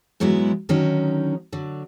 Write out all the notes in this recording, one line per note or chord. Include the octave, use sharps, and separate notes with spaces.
G#2 E3 F#3 G#3 B3 E4
D3 D#3 F#3 C#4 D#4
D3 F#3